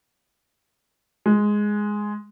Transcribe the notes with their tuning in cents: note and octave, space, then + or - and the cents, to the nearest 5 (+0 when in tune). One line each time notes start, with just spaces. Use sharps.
G#3 +0